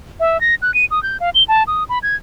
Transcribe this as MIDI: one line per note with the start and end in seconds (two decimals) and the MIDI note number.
0.20 0.40 76
0.41 0.55 94
0.62 0.74 90
0.74 0.85 99
0.91 1.02 87
1.03 1.17 91
1.20 1.30 77
1.35 1.43 103
1.48 1.63 81
1.67 1.84 87
1.89 1.99 83
2.03 2.16 92